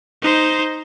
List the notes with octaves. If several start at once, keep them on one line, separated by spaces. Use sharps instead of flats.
D#4 C5